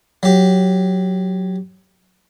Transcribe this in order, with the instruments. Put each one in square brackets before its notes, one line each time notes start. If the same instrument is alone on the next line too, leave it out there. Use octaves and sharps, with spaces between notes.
[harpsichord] F#3 G4